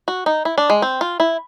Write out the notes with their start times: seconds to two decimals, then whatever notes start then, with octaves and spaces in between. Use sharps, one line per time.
0.08 F#4
0.26 D#4
0.45 E4
0.58 D4
0.70 G#3
0.82 C4
1.01 F4
1.20 E4